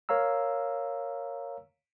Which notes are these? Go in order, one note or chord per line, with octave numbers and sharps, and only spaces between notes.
A#4 C#5 F5 A#5 E6